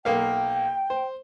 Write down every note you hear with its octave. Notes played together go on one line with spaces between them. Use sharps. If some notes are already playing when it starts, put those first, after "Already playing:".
B1 A#3 F5 G5
C5